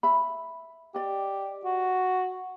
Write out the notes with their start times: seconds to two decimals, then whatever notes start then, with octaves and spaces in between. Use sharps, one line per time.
0.03 E5 B5
0.95 G4 D5 D#5
1.64 F#4